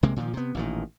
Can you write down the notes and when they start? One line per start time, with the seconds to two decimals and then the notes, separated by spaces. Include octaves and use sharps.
0.03 C2 C3 G#3 A#3
0.16 A#2 D#3 F3
0.33 C3 B3
0.55 A1 A#2 D#3